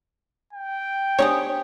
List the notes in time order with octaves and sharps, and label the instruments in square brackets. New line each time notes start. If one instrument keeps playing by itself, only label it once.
[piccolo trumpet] G5
[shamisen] B3 D#4 G#4 [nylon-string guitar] D4 G4 C5 [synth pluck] C#5